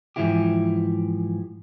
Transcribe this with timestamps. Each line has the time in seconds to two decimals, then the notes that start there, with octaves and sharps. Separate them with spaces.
0.16 G#2 E3 F3 E4 G4